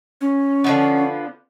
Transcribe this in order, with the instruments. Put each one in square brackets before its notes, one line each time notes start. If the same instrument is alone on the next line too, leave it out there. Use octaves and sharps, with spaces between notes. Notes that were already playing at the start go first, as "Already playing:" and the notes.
[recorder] C#4
[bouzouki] D3 F3 B3